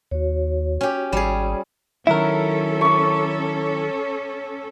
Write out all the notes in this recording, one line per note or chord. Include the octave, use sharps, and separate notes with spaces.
D#2 F#4 C#5
C#4 G4
G#1 G3 G#4
D#3 F#3 C#4 E4 A4 A#4 E5
C#6 D6